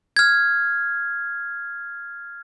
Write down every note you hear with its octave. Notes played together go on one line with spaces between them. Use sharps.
F6 G#6